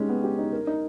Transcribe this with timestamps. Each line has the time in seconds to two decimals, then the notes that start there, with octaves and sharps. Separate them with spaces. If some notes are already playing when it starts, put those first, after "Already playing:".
Already playing: G#3 C#4 D#4 G4
0.09 B3
0.24 G4
0.39 D#4
0.53 A#4
0.67 D#4